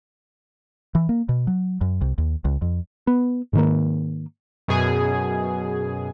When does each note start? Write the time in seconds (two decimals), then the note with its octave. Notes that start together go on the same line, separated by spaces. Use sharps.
0.95 E3
1.09 A#3
1.29 B2
1.47 F#3
1.81 F#2
2.01 C2
2.18 D#2
2.45 C#2
2.62 F2
3.07 B3
3.53 G#2 D#3 A#3
4.68 F#2 B2 G#4 G#5